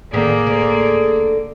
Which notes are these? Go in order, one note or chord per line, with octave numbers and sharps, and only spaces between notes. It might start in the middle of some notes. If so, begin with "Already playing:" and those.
A2 D3 D#3 A#3 C#4 G#4 D5
D2 D3